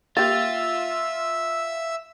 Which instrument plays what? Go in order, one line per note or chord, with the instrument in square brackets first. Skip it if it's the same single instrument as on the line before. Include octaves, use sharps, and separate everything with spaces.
[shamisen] A#3 G4 [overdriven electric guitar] F4 [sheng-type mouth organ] E5 E6 [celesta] A6